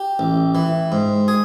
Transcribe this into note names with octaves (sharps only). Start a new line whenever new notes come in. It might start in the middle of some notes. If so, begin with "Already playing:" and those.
Already playing: G4
A1
E3
G#2
G#4